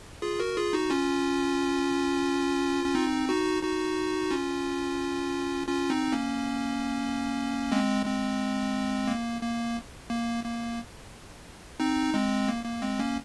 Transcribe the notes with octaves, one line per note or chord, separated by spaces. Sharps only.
F4 G#4
F#4 A#4
F4 G#4
D#4 F#4
C#4 F4
C#4
C4 D#4
D#4 F#4
D#4 F#4
C#4 F4
C#4 F4
C4 D#4
A#3 C#4
G#3 C4
G#3 C4
A#3
A#3
A#3
A#3
C4 D#4
G#3 C4
A#3
A#3
G#3 C4
A#3 C#4